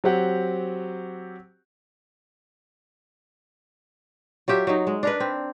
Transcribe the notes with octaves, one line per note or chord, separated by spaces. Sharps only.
F#3 C4 G4 F#5
F#3 F4 G4 E5
F#3 D#4
G#3
D4 A#4 B4
C4